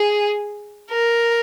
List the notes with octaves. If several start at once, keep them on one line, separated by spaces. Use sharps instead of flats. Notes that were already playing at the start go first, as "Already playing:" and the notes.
Already playing: G#4
A#4